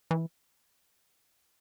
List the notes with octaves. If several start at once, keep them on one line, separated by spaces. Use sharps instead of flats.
E3